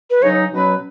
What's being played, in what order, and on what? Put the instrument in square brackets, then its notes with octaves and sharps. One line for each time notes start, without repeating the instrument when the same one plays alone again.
[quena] B4
[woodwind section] C#3 F#3 D#4 [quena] C#5
[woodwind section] B2 F#3 C#4 B4